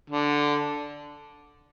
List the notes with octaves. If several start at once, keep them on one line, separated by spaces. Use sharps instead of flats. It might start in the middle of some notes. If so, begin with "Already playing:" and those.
D3